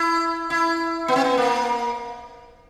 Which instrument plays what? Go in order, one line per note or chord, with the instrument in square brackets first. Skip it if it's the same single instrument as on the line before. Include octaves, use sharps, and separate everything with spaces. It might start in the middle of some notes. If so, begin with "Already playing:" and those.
Already playing: [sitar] E4
E4
B3
C4
B3
A#3